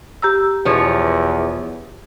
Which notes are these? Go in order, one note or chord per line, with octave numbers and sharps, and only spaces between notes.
G4 A#5 E6
E2 B2 F3 C#5